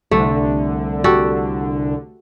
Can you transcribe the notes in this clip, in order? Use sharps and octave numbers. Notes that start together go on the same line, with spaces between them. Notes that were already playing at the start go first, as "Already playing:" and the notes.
C2 D3 A3
F#4 G4 A4